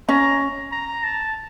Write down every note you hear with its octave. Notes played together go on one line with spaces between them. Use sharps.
C#4 A#5
A#5
A5